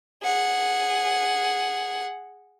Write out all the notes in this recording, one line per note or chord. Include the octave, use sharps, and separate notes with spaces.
G#4 F#5